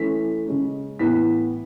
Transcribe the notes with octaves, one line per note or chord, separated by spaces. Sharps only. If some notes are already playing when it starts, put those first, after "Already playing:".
Already playing: E3 A3 C#4 B6
C#3 G#3 C#4
A2 E3 B3 B6